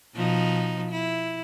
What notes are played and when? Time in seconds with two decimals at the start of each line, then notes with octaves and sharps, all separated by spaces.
0.15 B2 F3 D#4
0.91 E4